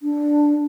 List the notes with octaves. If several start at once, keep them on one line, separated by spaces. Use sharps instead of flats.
D4